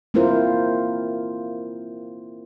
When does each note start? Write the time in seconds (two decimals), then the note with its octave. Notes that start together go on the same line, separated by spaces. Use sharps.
0.14 A#3 C4 E4 F4 A#4 C5